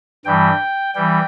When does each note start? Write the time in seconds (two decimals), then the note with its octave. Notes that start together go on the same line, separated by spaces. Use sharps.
0.25 G2 E3 G3 G5
0.95 E3 G3 G5